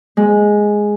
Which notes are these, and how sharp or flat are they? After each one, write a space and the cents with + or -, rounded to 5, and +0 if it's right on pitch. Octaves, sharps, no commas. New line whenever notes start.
G#3 +0